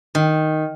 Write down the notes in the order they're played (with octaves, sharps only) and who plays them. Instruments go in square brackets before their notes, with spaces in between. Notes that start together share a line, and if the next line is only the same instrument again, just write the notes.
[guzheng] D#3